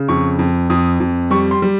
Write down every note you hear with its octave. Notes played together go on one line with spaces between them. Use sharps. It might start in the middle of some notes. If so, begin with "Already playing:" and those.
Already playing: C#3
F2 C#6
F2
F2 D#6
F2
G3 C#6
C6
G3